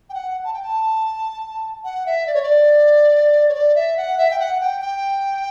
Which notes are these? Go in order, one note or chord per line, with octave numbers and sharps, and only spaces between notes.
G5
F#5
A5
G5
A5
F#5
E5
D5
C#5
D5
C#5
D5
E5
F#5
E5
G5
F#5
G5
G5